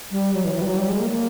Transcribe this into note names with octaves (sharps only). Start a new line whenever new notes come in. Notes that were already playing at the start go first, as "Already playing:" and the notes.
G3
F#3
E3
E3
G3
F#3
G3
G#3
A#3
A#3